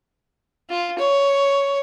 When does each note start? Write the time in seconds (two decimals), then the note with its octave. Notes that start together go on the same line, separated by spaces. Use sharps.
0.70 F4
0.98 C#5